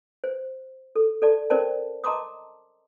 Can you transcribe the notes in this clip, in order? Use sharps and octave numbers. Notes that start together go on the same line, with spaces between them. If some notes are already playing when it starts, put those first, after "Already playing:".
C5
A4
A4 D5 A5
C#4 A#4 C5 D5 A5
D#5 A5 A#5 C6 D6 D#6